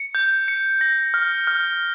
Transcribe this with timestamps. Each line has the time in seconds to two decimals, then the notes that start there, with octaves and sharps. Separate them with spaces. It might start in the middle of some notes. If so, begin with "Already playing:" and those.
Already playing: C#7
0.15 G6
0.48 C#7
0.81 A#6
1.14 F6
1.47 F6